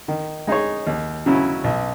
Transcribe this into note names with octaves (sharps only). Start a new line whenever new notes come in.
D#3
G#3 D#4 G#4 C#5
D#2
C#3 F#3 C#4 E4
B1